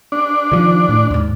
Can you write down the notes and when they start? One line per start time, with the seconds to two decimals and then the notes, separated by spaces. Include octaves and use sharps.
0.12 D4
0.52 D#3 F3
0.89 A2
1.11 D#2 G#2